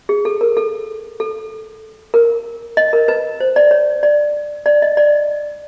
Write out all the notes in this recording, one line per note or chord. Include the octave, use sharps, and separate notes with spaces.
G#4
A4
A#4
A4
A4
A#4
D#5
A#4
B4
C5
D5
C#5
D5
D5
D#5
D5